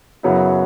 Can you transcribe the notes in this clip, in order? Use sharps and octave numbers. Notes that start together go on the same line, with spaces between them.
F#2 C#3 F#3 B3 E4